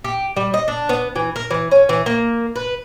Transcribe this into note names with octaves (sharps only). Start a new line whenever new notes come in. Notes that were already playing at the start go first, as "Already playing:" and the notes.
G4
G3
D#5
D4
B3
E3
A#4
E3
C#4
E3
A#3
B4